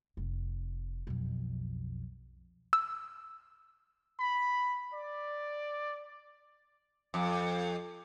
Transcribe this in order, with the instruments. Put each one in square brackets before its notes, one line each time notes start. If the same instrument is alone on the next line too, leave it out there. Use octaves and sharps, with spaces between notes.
[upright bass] F1
B1 F2
[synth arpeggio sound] E6
[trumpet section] B5
D5
[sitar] F2